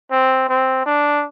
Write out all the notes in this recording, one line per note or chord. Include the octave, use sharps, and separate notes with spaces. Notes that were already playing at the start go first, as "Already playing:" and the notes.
C4
C4
D4